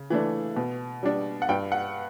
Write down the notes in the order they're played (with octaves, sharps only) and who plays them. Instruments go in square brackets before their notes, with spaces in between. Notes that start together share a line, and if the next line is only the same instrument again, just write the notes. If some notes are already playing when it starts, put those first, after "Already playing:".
Already playing: [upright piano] C#3
E3 A3 D4
B2
G3 D4
F#5
G2 G5
F#5